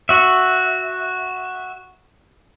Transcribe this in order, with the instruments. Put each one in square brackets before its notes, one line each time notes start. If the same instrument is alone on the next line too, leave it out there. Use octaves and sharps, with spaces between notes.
[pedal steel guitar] F#4 E5